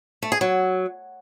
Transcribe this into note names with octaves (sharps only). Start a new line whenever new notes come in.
A3
G#4
F#3